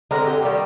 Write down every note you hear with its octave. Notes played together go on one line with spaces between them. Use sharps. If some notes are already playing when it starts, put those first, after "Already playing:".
D3 G#3 C4 A#4
G4
D#3 G3 A#3 G4